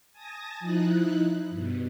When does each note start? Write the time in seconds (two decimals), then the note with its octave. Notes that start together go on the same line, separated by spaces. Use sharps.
0.12 G#5 A5 D#6 A#6
0.60 F3 D#4 E4 F#6
1.50 G2 B2